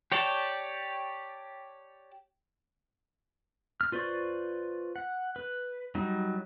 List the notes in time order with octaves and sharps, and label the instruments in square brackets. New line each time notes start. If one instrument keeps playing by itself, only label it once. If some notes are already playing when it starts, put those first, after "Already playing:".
[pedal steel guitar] G4 C#5 D5 G5 A5
F6
F4 B4 C5 D5 C#6
F#5
B4
F#3 G3 D#4